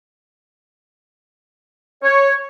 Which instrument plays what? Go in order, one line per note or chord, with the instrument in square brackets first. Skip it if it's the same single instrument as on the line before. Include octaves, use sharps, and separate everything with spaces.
[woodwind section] C#5